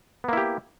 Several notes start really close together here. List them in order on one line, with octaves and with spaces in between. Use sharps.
B3 A#3 E4 G4